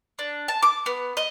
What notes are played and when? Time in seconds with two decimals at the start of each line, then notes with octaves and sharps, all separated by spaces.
0.19 D4
0.48 A5
0.62 D6
0.86 B3
1.17 D#5